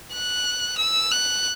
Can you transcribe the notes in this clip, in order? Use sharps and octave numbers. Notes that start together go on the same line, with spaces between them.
F#6
E6
F#6